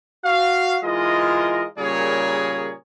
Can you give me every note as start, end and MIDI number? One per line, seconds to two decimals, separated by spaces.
0.24 0.77 66
0.24 0.77 77
0.83 1.65 52
0.83 1.65 56
0.83 1.65 65
0.83 1.65 70
0.83 1.65 75
1.78 2.73 46
1.78 2.73 49
1.78 2.73 55
1.78 2.73 68
1.78 2.73 70
1.78 2.73 73